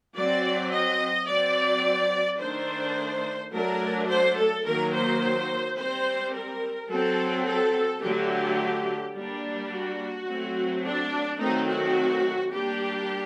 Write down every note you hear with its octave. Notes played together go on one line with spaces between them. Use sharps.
F#3 C4 D5
D#5
F#3 C4 D5
D#3 A3 D4 C5
F#3 A3 D4 A#4
C5
A4
D#3 F#3 A#3 A#4
C5
G3 C4 C5
A#4
F#3 C4 A4
A4
D3 F#3 A3 G4
G3 A#3 D4
F#4
F#3 A3 C4
D4
D#3 F#3 A3 C4 D#4
F#4
G3 A#3 D4 G4